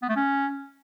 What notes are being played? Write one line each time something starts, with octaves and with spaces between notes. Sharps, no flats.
B3
A3
C#4